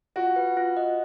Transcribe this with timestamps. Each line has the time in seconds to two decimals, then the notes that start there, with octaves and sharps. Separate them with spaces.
0.16 F4 F#4
0.36 B4
0.57 F4
0.77 D#5